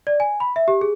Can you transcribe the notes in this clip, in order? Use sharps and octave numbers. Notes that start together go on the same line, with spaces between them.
D5
G#5
B5
E5
G4
G#4